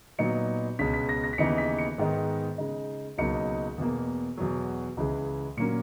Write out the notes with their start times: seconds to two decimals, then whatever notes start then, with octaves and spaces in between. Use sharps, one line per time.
0.18 A#2 F#3 B3 D#4 C#7
0.79 C#2 B2 G#3 C#4 B6
0.94 B6
1.09 A#6
1.24 A#6
1.33 B6
1.38 D#2 C#3 E3 B3 D#4 C#7
1.58 B6
1.78 C#7
1.98 G#2 D#3 G#3 B3 D#4
2.58 C#3 G#3 D#4
3.18 C#2 B2 F#3 A#3 D#4 C#7
3.78 E2 B2 A#3
4.37 E2 B2 F#3
4.97 C#2 C#3 E3 G#3
5.57 A#2 F#3 A#3 C#4 C#7